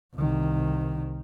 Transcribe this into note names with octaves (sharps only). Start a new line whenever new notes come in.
C2 D#3